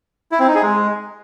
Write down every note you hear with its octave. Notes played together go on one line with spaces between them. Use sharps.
E4
C4
D#4
G#4
G#3